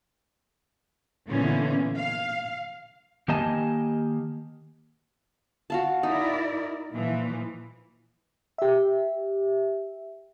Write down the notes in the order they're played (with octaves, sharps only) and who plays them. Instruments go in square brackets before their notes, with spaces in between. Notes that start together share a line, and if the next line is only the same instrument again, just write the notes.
[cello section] A#2 D3 E3 B3 C#4
F5
[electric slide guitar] D#3 A#3 G4 D#5 G#5 A5
[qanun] F#4 F5 A5
[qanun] D#4 [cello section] E4 A#4 D5
[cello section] A#2 E3 F3
[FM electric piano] G4 E5